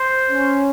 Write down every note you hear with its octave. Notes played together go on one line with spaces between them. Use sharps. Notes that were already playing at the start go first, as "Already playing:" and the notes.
Already playing: C5
C#4